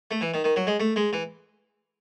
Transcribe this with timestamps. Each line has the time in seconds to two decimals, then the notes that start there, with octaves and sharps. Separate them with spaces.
0.11 A3
0.21 E3
0.34 D#3
0.44 D#3
0.56 F#3
0.67 G#3
0.80 A3
0.96 G#3
1.13 E3